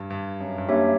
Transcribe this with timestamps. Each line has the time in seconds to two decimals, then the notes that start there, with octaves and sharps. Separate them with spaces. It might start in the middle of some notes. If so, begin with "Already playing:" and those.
Already playing: G2
0.10 G2
0.40 F#2
0.58 G2
0.69 F#2 A#3 D4 G4 C#5 E5